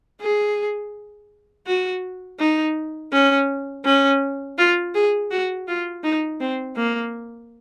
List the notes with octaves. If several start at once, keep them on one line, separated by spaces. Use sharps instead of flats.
G#4
F#4
D#4
C#4
C#4
F4
G#4
F#4
F4
D#4
C4
A#3